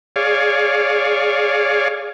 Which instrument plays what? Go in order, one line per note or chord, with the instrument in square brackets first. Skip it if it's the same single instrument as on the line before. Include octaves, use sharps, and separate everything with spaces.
[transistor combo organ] G#4 C#5 D5 F5